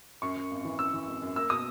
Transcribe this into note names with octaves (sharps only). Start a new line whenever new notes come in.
F#2 C#6
F#2
G#1
E3
F#2 E6
E3
G#1
F#2
A#3 E6
B2 D#6